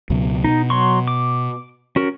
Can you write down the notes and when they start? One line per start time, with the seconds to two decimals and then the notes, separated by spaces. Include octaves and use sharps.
0.10 C#2 B2 F#3
0.44 B2 D#4
0.70 F#3 C6 C#6
1.08 D6
1.96 C#4 F#4 A#4